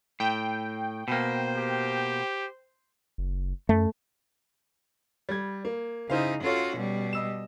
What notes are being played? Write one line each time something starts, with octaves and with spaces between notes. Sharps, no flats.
A2 G5
B2 A#3 C5
G4
F#1
F#2 A3
G3 G#6
A#3
C#3 D#4 E4 C5 F5
C#4 F4 F#4 A4 C#5
B2 G3
D#5 E6 E7